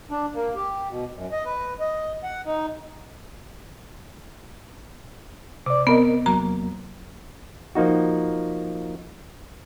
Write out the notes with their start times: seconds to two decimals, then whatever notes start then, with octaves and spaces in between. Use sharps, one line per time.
0.11 D4
0.35 A#3
0.55 G4
0.89 B2
1.14 F#2
1.32 D#5
1.45 B4
1.80 D#5
2.23 F#5
2.45 D#4
5.66 C3 D5 D6
5.87 B3 C4 A#4 D#5
6.26 E2 F#3 A#3 A#5
7.75 F3 A#3 D#4 F#4